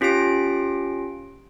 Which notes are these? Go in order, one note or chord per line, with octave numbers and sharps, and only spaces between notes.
C#4 F4 G4 A#6 D7